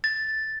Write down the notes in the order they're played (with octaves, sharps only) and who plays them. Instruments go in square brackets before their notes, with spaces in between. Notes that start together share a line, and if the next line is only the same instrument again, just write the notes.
[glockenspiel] A6